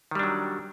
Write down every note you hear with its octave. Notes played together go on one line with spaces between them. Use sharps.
D#3 F#3 G3 D4